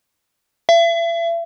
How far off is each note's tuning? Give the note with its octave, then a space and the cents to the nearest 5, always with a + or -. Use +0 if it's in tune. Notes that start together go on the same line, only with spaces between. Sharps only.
E5 +35